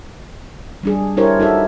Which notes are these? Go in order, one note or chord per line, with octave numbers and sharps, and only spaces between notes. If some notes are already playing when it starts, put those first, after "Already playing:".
G3 D4 G#4
D4 E4 G4 A#4 C5 C#5
D#4 F#4 A4 E5